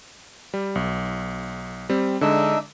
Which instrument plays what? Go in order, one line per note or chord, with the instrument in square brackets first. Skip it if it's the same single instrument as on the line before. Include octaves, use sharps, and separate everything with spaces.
[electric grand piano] G3
B1
G3 C4
[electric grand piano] D3 G#3 [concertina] D4 D#4 E5